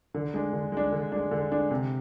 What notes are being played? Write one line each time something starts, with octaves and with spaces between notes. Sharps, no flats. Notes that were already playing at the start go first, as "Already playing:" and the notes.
D3
G#3 D4
D3
G#3 D4
D3
G#3 D4
D3
G#3 D4
C3